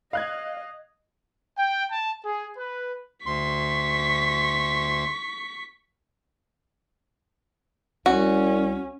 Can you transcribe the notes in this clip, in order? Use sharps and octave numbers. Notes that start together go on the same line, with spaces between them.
D#5 F5 F#6 G#6
G5
A5
G#4
B4
D2 C6 C#6 B6
C2 C#4 F#4